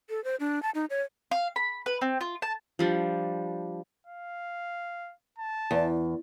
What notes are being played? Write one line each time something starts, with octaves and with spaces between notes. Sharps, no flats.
A4
C5
D4
A5
D#4
C#5
F5
B5
B4
C4
F4
A5
F3 G3 D4
F5
A5
E2